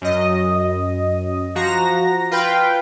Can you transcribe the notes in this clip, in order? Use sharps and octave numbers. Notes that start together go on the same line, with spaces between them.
F#2 D#5
F3 F#4 A#5 A#6
F4 B4 G5